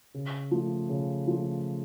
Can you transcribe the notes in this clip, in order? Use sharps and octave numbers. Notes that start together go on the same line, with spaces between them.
C#3
F3 A3
C#3
F3 A3